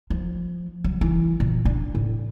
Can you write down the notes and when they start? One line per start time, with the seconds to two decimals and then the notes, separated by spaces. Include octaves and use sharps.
0.10 F3
0.84 F#3
1.01 E3
1.40 A#2
1.65 D4
1.95 A2